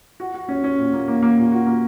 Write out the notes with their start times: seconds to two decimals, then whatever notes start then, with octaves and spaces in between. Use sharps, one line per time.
0.20 F#4
0.34 F#4
0.49 C#4
0.64 C#4
0.78 A#2
0.93 A#3
1.08 A#3
1.22 A#3
1.37 A#2
1.52 F#4
1.67 A#3